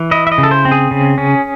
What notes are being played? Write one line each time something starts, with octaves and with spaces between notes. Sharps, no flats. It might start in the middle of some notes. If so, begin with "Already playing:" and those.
Already playing: E3
E4 D#5
E5
D#5
C#3
A4
C5
C4
G#4
C#3
C#4